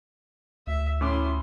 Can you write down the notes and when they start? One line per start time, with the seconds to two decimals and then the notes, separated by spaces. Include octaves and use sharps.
0.67 D2 E5
1.01 A2 C#4 E4 C6 D6